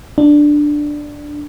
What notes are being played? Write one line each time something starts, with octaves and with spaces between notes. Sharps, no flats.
D4